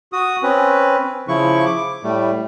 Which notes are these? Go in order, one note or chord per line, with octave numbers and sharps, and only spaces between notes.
F#4 D#6
C4 C#4 B4
C#3 F3 E4 C#6
D6
A2 G3 A3